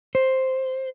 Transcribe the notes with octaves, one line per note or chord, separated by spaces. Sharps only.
C5